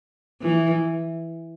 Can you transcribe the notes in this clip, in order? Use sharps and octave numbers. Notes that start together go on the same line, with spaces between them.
E3